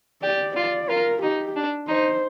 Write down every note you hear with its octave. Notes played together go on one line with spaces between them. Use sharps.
G4 D5
F4 D5
F4 A#4
D#4 G4
D4
D#4 C5